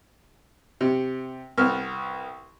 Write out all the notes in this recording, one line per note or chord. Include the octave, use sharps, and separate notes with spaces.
C3
C2 B3 F6